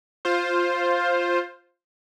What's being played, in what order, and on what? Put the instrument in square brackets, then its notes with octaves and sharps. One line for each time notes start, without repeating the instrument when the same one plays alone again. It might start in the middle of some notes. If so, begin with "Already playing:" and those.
[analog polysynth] F4 C5